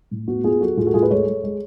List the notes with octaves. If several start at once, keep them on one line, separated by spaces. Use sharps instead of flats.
A2
B3 F#4
B3 F4 G#4
F#3 F#4 A4
A2 F4 G#4
F#4 A4
A2 F4 G#4
B4
G#3 A4 C#5
G#3
G#3